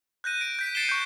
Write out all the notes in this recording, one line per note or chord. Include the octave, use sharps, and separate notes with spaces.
F#6 G6 A#6 D#7
D7
G6 B6 D7
A6 C7 C#7 D#7 E7 G7
C#6 G6